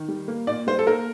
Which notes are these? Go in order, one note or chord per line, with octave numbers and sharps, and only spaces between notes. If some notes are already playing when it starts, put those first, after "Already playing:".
Already playing: D#3
G3
A#3
A#2 D5
G3 C5
A4
A#3 A#4